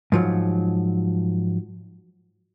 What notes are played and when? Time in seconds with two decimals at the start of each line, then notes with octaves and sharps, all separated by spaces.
0.12 G#2 F3 F#3